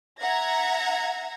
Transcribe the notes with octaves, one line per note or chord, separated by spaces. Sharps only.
E5 F#5 A#5 G#6 A#6